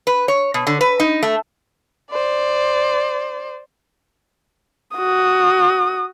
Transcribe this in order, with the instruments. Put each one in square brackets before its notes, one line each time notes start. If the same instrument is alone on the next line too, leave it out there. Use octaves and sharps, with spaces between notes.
[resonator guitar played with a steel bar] B4
C#5
B2
D3
B4
D#4
A3
[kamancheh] C5 D5
F#4 D#6